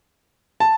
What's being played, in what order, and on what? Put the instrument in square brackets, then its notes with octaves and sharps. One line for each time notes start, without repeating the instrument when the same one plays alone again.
[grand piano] A5